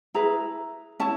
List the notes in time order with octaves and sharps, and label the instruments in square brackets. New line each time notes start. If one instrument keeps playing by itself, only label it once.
[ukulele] E4 G#4 B4 A#5
C#4 E4 A5